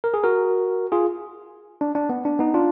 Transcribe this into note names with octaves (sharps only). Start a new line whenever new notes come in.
A#4
G#4
F#4 A#4
F4 G#4
D4
D4
B3
D4
B3 D#4
D4 F4